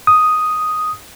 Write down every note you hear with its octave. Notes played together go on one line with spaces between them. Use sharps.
D#6